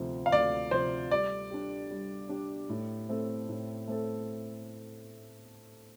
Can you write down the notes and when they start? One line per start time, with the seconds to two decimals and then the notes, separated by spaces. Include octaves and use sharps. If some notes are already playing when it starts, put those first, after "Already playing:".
Already playing: D2 C3 F3
0.26 F5
0.32 D2 D5
0.71 C3 F3 C5
1.11 G3 D5
1.50 D4 G4
1.91 G3
2.29 D4 G4
2.69 A2
3.09 A3 C4 A4
3.49 A2
3.88 A3 C4 A4